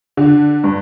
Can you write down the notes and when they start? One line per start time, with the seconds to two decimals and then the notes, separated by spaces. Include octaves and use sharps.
0.17 D3
0.64 G2